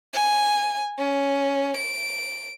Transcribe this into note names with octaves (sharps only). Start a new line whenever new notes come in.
G#5
C#4
D7